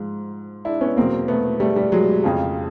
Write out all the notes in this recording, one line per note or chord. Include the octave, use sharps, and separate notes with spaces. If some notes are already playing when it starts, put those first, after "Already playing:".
Already playing: G#2 F3
D4 E4
B3 C#4
E2 B2 F#3 A#3 C4
A3 B3
G3 A3
G3
F#3 G#3
F2 C#3 F3